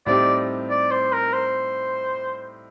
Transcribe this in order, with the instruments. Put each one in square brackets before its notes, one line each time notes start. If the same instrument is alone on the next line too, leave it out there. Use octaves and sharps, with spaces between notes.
[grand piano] A2 G3 C4 D#4 G4 [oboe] D5
[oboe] D5
C5
A#4
C5